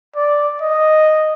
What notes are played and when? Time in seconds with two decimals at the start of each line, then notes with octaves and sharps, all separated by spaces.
0.16 D5
0.62 D#5